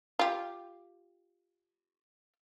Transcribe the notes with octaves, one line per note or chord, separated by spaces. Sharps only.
F4 G4